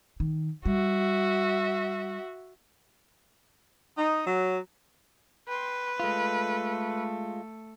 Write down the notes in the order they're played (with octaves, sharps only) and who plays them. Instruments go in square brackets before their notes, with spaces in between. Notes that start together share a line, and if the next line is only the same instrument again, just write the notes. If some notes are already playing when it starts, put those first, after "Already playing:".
[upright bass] D#3
[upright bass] G3 [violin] F#4 E5
[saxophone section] D#4
F#3
[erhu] B4 [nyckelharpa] G5 C6
[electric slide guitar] G#3 F4 [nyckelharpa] A3 A4